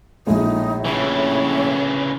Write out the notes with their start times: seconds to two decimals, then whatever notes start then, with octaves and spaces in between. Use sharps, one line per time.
0.27 A#1 A2 G#3 D#4
0.85 C#3 E3 C#5